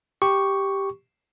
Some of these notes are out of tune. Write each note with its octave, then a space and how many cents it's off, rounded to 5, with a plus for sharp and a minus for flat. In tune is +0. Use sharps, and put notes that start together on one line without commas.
G4 +0 C#6 +0